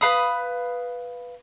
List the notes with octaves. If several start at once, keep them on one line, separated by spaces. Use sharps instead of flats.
B4 F5 B5 D#6